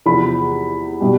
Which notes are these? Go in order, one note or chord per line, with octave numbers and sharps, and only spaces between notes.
E2 C3 F3 B5
B2 G3